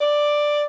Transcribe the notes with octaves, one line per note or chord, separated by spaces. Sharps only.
D5